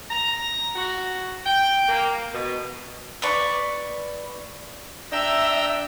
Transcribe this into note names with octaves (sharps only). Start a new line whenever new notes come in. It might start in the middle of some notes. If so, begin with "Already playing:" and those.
A#5
F#4
G5
A#3
B2
B4 D5 C#6
D4 E5 G5 A#5 E6